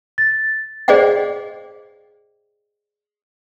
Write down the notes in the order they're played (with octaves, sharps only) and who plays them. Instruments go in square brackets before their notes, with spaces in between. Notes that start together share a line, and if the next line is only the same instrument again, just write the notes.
[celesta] A6
[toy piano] G#4 C5 D5 D#5 F5 G5